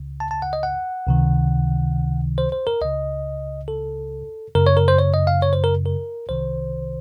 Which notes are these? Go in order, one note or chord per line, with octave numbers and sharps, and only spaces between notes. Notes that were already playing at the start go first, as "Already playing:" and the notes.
Already playing: C#2 C#3
A5
A5
F#5
D#5
F#5
C#2 C3 D#3
C5
C5
A#4
C#2 C#3 D#5
A4
F#2 C#3 A#4
C#5
A#4
C5
C#5
D#5
F5
C#5
C5
A#4
A#4
C2 C3 D#3 C5